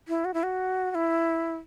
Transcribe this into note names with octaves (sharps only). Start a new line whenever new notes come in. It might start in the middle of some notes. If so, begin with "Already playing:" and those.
E4
F#4
E4
F#4
F#4
E4